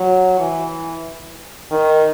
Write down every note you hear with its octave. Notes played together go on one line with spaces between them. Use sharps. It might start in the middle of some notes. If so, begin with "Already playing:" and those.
Already playing: F#3
E3
D#3